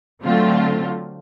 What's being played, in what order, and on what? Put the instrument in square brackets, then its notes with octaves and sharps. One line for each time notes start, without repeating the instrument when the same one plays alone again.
[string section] D3 F#3 A3 C4 F4